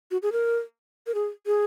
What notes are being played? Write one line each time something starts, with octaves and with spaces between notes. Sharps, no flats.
F#4
G#4
A#4
A#4
G#4
G#4